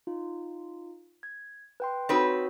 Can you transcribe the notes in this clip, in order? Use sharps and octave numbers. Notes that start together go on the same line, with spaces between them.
D#4 F4
G#6
B4 G5 C6
C4 D#4 F#4 B4 C#5